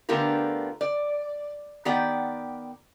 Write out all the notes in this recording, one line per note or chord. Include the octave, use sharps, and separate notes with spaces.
D3 A3 B3 F4 G4 A#4
D5
D#3 B3 G4 D5 F#5 G5